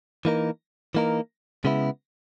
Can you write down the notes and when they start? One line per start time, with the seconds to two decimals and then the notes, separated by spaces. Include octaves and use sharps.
0.25 E3 A#3 D#4 A#4
0.95 E3 A#3 D#4 A#4
1.65 C#3 G#3 B3 E4